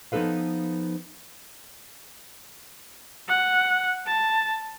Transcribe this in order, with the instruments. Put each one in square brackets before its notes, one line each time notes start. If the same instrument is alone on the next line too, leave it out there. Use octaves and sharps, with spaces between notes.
[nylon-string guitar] F3 B3 D#4 A4 B4 F5
[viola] F#5
A5